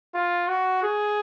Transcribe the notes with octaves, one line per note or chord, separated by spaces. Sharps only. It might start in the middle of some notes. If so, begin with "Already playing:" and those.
F4
F#4
G#4